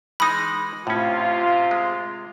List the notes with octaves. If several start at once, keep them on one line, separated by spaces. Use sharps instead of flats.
E3 G#3 D#4 B5 D#6
A2 C3 C#4 F4
G#3